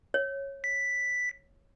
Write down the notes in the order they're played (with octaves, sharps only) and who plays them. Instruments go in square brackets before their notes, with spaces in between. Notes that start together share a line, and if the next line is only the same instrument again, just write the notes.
[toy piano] C#5
[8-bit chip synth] B6